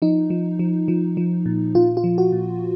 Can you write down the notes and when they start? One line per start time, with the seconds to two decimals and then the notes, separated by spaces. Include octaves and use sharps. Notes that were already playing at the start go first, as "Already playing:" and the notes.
0.02 F3 D#4
0.30 F3
0.59 F3
0.88 F3
1.17 F3
1.46 A#2
1.75 A#2 F4
1.97 F4
2.04 F3
2.18 F#4
2.32 A#2